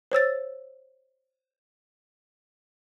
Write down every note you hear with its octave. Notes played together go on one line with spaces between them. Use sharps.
C5 C#5 E6 A6